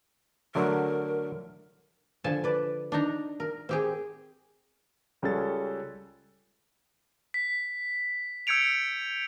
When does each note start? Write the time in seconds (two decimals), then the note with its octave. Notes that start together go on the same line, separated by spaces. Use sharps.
0.55 D3 F#3 A3 A#4
2.24 D3 F3 G#5 A5
2.44 B4 D5
2.92 D4 D#4 A#5
3.40 A#4
3.69 C4 G4 G#4
5.22 C#2 G3 C#4 G#4 A4 A6
7.34 B6
8.47 E6 G6 G#6 C#7 D7 F7